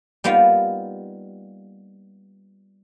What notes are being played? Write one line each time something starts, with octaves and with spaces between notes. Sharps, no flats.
G3 A#3 B3 D#4 F4